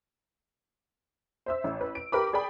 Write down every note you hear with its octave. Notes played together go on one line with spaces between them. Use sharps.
C5 E5 E6
A1
B4
D7
G4 A#4 B4 B5 D6
G#4 D5 G5 B5